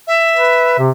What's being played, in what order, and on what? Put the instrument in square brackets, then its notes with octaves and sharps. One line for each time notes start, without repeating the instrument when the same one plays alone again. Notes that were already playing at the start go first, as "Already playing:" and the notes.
[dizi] E5
[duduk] B4
C3